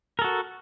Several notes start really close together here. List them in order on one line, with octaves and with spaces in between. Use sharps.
A#4 A4 F#4